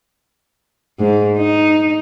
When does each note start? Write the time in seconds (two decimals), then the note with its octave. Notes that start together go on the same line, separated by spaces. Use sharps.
1.00 G#2
1.38 D#4